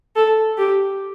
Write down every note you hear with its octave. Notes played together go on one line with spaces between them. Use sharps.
A4
G4